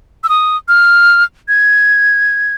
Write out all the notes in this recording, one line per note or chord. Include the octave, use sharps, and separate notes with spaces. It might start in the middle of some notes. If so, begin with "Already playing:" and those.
E6
D#6
F6
G#6